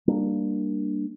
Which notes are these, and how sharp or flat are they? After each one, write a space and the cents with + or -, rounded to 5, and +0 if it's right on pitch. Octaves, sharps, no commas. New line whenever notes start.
G3 +10 A#3 +0 D4 +15